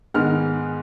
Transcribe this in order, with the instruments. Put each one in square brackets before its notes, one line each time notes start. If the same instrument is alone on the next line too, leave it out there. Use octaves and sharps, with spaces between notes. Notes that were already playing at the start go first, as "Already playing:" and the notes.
[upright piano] G#2 D#3 G#3 B3 F6